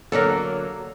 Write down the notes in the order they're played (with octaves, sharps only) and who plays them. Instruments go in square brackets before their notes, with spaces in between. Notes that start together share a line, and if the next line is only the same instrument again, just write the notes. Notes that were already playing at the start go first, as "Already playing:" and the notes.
[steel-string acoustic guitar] D3 F#3 A#3 [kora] A4 A#4